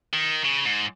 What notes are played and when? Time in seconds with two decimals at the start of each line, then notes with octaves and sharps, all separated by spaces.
0.13 D#3
0.45 C#3
0.65 G#2